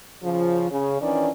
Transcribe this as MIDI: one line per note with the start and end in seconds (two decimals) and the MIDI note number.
0.22 0.67 49
0.22 0.67 53
0.70 0.97 49
1.00 1.29 51
1.00 1.29 52
1.00 1.29 61
1.00 1.29 62
1.00 1.29 74